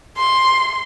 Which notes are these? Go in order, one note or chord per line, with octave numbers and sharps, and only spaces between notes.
C6